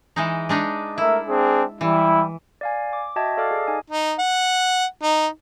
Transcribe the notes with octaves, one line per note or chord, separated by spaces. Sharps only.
E3 G#3 D#4
G#3 D4 D#4
A3 E4 A#4 E5
C4 D4 G#4
E3 G3 E4
D5 F5 G#5
D6
F#4 D#5 E5 G5 A5 G#6
A4 D5 F5 A5 D6 F6
G#4 D#5
D#4 G#5
D#4
F#5
D#4